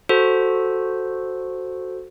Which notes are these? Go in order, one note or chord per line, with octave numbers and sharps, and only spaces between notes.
F#4 A4 C5